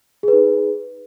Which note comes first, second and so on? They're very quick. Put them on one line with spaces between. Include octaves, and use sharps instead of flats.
G#4 B4 D#4